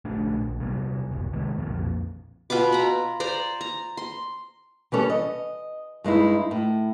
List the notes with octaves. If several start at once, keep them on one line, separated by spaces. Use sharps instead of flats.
A#1 A3 D4
A#1
C3 G3 B3
F#1 C2
C3 D#3 G#3 B3
B1 F2 A#2
B2 F4 B4 D6
A#5 B5
C5 D5 A#5
A#5
C6
E3 G3 C#4 A4
D#5
G2 G#3 D#4 E4
A2